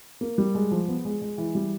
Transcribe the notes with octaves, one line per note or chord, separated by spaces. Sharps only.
A#3
G3
G#3
F3
B3
G#3
G#3
E3
G3